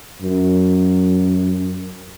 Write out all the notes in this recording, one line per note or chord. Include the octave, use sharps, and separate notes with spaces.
F#2